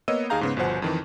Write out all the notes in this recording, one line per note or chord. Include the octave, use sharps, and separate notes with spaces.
A#3 B3 C#5 D#5 E6 D#7
D#2 D#4 G#4 F5 A#5 G6
G#2 C#3 B3
G1 B2 F3 C5 F#5
F2 D#3 E3